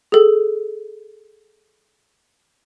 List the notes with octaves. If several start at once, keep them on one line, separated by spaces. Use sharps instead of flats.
G#4 A4